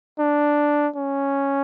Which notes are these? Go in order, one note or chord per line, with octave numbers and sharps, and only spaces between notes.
D4
C#4